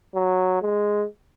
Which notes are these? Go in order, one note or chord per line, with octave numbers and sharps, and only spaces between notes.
F#3
G#3